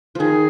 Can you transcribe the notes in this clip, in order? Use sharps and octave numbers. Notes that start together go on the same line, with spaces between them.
D#3 F3 G#4